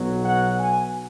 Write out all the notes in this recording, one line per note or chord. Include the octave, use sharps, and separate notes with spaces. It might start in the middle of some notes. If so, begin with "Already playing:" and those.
Already playing: B1 B2 F#3
F#5
G#5